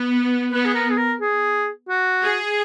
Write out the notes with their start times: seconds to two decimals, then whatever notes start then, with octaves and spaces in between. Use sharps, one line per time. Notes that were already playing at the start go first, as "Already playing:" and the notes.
Already playing: B3
0.51 B3 B4
0.65 G#4
0.74 A#4
0.90 G#4
0.97 A#4
1.20 G#4
1.89 F#4
2.23 G#4